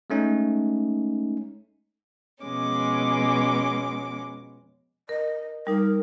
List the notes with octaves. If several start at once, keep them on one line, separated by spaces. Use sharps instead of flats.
G#3 A3 C#4 D#4
F2 B2 G#3 C#4 D6
A#4 D#5
G3 D#4 A#4